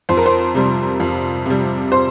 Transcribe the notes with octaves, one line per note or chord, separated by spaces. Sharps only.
F2 C5
A#4
C5
C3 G3
F2
C3 G3
C5